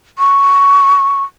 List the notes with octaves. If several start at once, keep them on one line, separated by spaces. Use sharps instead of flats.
C#6